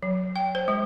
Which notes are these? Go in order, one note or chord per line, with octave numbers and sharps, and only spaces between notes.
F#3
G5
C5
G#3